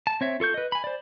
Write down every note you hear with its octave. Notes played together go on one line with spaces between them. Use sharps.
A5
C4 C#5 E5
F4 A4 C#6 G6
B4 D#5
G#5 B5
C5 D5